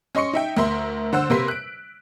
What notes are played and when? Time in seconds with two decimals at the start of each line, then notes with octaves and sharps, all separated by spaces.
0.15 C#4 D#5 C6 C#6 C#7
0.33 D#4 E5 G5
0.57 D2 A#4 E5 C6
1.13 D3 C5 F#5 E6
1.30 C3 A#3 B4 C6 B6
1.48 F#6 D7